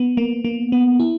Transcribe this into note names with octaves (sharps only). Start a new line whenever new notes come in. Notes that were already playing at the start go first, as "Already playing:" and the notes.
Already playing: B3
A#3
A#3
B3
E4